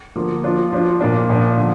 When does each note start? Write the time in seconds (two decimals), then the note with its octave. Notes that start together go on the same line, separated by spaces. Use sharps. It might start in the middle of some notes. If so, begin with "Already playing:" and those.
0.16 D3 F3 A#3 F4
0.44 F3 D4 F4
0.73 F3 D4 F4
1.01 A#2 F3 A#3 D4
1.30 A#2 F3 D4
1.57 D3 F3